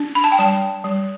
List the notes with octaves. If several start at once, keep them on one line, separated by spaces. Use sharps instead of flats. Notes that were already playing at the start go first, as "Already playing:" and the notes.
Already playing: D4
B5
A5
G5
G3 A5
G3